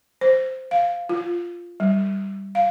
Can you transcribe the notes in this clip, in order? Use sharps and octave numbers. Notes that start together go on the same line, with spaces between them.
C5
F5
F4
G3
F5